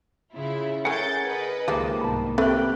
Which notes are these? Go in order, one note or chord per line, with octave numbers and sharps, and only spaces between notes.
C#3 E4 F4
A3 C#4 G#4 A#4 F#5 G6 A6
B4 D#5
C#2 D#3 F3 G#3 A#3 G4
C2 G#2 B2 A5 B5
A3 C4 G4 B4 G5 F#6